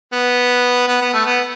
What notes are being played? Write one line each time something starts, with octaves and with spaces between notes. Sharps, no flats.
B3
B3
B3
A3
B3